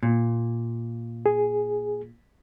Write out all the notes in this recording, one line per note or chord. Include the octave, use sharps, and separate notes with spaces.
A#2
G#4